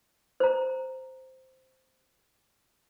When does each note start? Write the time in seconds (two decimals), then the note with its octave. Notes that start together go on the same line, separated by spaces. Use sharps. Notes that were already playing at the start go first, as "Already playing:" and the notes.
0.40 C5 A#5